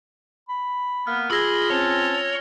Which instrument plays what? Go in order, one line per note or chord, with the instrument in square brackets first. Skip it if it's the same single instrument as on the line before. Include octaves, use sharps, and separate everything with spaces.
[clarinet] B5
[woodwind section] A#3 B3 [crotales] F6
[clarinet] F4 [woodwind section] G#4 [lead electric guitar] B5 [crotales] E6 A#6 G7
[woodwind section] C4 C#4 A5 [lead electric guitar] C#5